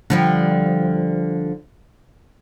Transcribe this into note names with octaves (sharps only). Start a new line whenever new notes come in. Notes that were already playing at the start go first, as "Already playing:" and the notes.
D3 F3 G3